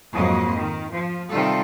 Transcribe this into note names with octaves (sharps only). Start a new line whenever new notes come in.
F2 G#2 F#3 A#3 D#5
D#3
F3
C3 D#3 G3 F4 A4